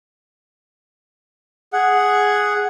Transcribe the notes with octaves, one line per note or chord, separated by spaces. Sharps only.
G#4 F#5